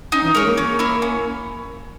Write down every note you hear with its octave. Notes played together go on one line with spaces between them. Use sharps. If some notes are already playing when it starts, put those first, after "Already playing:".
C#4 D#4
E3
G#3 A#4 C#5
A#3
C#4
E4 A#4 C#5
C#4